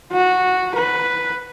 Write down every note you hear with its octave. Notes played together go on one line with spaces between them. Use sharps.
F#4
B4